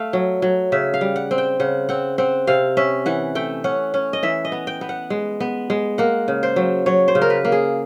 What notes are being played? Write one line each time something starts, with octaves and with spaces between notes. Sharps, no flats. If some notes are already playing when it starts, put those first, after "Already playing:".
Already playing: A3 F5
F#3
F#3
C#3 E5
F5
G3
F#5
C4
G5
C#3 F#5
C4 F#5
C4 F#5
C3 F5
C#4 E5
E3 F#5
A3 G5
C#4 F#5
C#4
D#5
E3 E5
D#5
B3
G5
B3
F#5
G#3
B3
G#3
A#3 F#5
C#3
C5
F#3
F#3 C#5
C5
C#3
A#4
B4
A#3
G#4